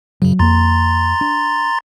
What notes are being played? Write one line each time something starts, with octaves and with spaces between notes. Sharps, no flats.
F#2 C#3 F#3
F2 A#3 A#5 C6 A6
D4